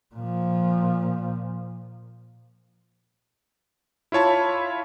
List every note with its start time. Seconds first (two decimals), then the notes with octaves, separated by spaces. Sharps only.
0.15 A#2 F3
4.12 E4 F4 C#5 A5 B5